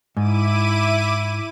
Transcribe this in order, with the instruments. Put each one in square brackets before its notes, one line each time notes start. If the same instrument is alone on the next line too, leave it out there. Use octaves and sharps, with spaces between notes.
[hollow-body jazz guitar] G#2 [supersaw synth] E4 D6 D#7